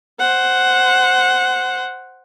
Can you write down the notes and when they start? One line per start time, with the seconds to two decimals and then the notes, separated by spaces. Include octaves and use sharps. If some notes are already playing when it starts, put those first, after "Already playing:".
0.19 C5 F#5